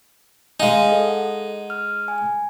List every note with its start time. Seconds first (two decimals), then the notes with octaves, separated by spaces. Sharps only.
0.60 G#3 D#4 F5 G#5
0.89 A4 D#5
1.07 F#5
1.70 F6
2.08 G#5